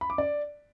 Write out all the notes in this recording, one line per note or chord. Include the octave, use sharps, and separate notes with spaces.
B5
D6
D5